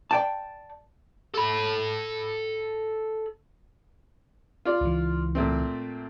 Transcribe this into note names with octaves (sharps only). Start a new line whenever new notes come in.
D5 G5 A5
A4 B5
F4 D5
C#2 E3
A#2 A3 C4